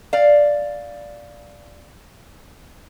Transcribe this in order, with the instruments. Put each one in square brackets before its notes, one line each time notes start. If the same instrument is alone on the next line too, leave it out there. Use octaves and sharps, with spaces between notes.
[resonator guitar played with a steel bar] D5 F5